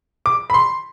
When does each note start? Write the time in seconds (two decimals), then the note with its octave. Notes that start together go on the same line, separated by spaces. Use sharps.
0.26 D6
0.50 B5
0.54 C6